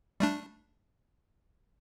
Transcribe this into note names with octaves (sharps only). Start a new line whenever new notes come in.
G3 A3 D4